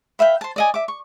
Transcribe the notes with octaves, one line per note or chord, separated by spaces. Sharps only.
B4 E5 F5 G5
C5 A5
D5 D#5 G#5
E5 D6
C#6